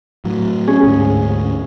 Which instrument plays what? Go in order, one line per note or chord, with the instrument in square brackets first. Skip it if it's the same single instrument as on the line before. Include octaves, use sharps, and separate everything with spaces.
[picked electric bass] A2 F#3
[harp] C#4 G#4
[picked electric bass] D2 G#2 [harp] G#4